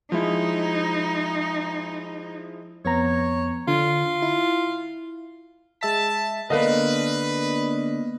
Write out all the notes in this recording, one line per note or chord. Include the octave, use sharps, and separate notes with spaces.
F3 G#3 D#4 E4
F2 B3 C#5 A#5
D3 F4
E4
G#3 E5 A5 B6
D3 A#3 B3 D4 A#4 B4 D#5 F5